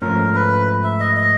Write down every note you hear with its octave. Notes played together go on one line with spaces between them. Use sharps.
G#2 F3 A3 C#4 A#4
B4
E5
D#5
D#5